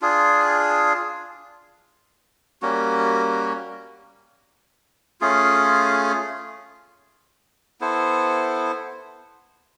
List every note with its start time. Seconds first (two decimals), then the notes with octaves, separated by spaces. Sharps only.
0.02 D4 F4 G#4
2.62 G3 A#3 C#4 F#4
5.21 A3 C#4 F4 G#4
7.81 B3 E4 A4 C5